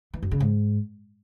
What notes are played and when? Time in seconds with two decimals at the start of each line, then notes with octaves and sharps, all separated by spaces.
0.14 E3
0.22 F#2
0.31 C#3
0.40 G#2